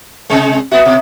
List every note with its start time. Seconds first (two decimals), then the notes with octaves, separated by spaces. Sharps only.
0.30 C3 G#3
0.72 B3 F#4 E5
0.85 B2